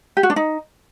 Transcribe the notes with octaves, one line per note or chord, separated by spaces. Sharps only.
G4
F#4
D4
D#4